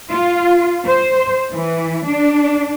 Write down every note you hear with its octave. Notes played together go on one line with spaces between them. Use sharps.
F4
C5
E3
D4